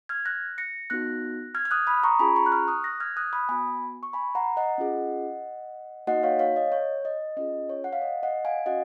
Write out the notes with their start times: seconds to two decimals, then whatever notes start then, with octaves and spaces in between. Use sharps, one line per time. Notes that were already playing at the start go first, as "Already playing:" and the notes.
0.09 F6 G#6
0.25 F#6 A#6
0.58 A#6 C#7
0.90 B3 D#4 F#4 F#6 A#6
1.55 F6 G#6
1.65 F6
1.71 D#6 F#6
1.87 B5 D#6
2.04 A#5 C#6
2.19 C#4 F4 G#4 G#5 B5
2.36 A#5 C#6
2.46 F#6
2.52 C#6 F6
2.68 D#6 F#6
2.84 F#6 A#6
3.00 F6 G#6
3.17 D#6 F#6
3.33 B5 D#6
3.49 B3 F#4 G#5 B5
4.03 C#6
4.13 G#5 B5
4.35 F#5 A#5
4.57 D#5 F#5
4.78 C#4 F4 G#4
6.07 A#3 D#4 F#4 D#5 F#5
6.23 C#5 F5
6.39 C#5 F5
6.56 D#5
6.72 C#5
7.05 D#5
7.37 C#4 F4 G#4 D#5
7.69 C#5
7.84 F#5
7.93 F5
8.02 D#5
8.23 D#5 F#5
8.45 F5 G#5
8.66 C#4 F#4 D#5 F#5